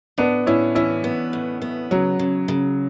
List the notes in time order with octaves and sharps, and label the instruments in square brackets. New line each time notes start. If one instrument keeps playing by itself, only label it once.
[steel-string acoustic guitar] A2 [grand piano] B3 D4
[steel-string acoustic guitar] A2 [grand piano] C#4 E4
[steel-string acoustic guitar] E3 [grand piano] C#4 E4
[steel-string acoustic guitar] B3
A2
B3
[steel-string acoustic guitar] C#3 [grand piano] F#3
[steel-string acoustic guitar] C#3
C#3